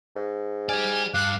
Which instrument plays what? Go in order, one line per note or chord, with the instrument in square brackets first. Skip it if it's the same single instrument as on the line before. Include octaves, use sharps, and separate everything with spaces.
[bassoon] G#2
[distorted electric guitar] G4 D5 [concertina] G#5 F6
[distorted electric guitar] G2 G4 [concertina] F5 D6 [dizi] F#6